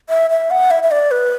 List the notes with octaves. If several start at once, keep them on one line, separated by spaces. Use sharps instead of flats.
E5
E5
F#5
E5
E5
D5
B4